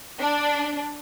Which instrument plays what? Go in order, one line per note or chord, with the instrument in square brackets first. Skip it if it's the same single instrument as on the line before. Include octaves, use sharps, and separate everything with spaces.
[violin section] D4